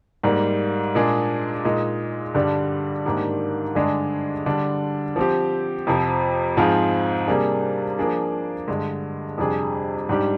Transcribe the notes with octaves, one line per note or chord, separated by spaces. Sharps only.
G#2 G3 A#3
A#2 G#3 D4 G#4
A#2 G#3 D#4
G2 D3 G3 D4
G#2 D#3 A#3 D4 G4
G2 D3 G#3 D4 G#4
D3 G3 D4
F3 C4 G4
F2 C3 F3
G#2 F3 C4 F4 G#4
C3 G3 A#3 D4 G#4
F3 A#3 D4 G#4
G2 D3 G#3
F2 C3 G3 D4 G#4
G#2 G3 D4 G4